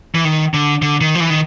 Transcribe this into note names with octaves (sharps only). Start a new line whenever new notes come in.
E3
D#3
D3
D3
D#3
F3
E3
D#3